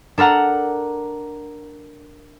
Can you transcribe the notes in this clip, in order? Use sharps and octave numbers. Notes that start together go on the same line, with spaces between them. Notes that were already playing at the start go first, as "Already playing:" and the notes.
D4 A4 A#4 F#5 A#5